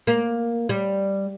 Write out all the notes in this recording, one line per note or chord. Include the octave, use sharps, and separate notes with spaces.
A#3
G3